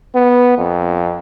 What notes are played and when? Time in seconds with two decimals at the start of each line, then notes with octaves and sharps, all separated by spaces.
0.15 B3
0.58 F2